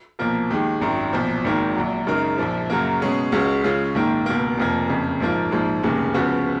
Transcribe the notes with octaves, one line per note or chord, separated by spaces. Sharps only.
B1 A#2 F3 A#3
D#2 D#3 G#3
G#1 F#2 D#3
B1 A#2 F3
G#1 G#2 D#3 A#3
A#1 A#2 F#3
F#2 C#3 G#3 D#4 A#4
A#1 A#2 F3
F#2 C#3 F#3 A#3
B2 G#3 C#4 G#4
C#2 C#3 G#3 C#4 F#4
C#3 G#3 C#4 F4
A#1 G#2 D#3 A#3
C#2 B2 A#3
F1 F2 F3 A#3
F#1 F2 C#3
A#1 G#2 F3 A#3 F4
A#1 G#2 F3 G#3
F1 D#2 C#3 G#3
C#2 C#3 F3 B3 F#4